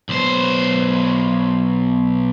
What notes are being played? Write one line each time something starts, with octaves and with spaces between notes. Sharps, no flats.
B1 C5